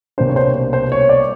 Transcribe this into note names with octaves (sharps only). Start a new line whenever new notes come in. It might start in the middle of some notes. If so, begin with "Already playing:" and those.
C2 B2 G3 A#3 D4 C5
C#5
C5
C5
C#5
D5